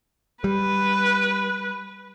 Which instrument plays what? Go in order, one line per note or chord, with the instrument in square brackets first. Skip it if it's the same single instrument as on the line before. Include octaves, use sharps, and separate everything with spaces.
[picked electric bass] G3 [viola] B4